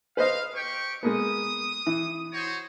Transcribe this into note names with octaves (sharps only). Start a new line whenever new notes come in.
B4 C5 D#5 F5
G4 G5 C#6
G#3 A#3 B3 D#6
E3
F#4 C5 C#5